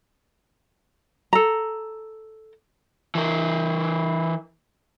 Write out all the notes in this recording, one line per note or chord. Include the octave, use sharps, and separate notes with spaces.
A4 A#5
E3 A#4